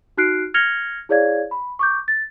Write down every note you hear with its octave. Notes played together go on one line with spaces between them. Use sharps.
D#4 F#4 F6 F#6 C7 D7
F6 G#6 A#6 C#7 F7 G7
E4 G#4 C#5 D5 F5 G#6
B5
C#6 D6 G6
A6